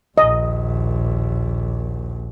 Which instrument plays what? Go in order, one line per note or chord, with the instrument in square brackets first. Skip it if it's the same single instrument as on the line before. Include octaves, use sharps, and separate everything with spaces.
[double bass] A#1 D#2 [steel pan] D#5